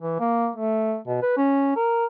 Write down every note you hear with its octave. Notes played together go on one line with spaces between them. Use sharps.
E3
A#3
A3
B2
B4
C#4
A#4